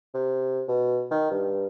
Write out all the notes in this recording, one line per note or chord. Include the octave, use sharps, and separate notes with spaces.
C3
B2
D#3
G2